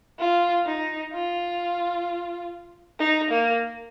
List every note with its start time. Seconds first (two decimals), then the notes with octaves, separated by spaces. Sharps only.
0.19 F4
0.66 D#4
1.13 F4
3.00 D#4
3.30 A#3